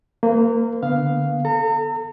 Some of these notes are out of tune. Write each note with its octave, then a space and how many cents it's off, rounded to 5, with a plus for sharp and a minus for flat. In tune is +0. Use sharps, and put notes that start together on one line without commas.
A#3 -20 B4 +40
D3 +0 B3 +0 F5 +0
A4 +0 A#5 -40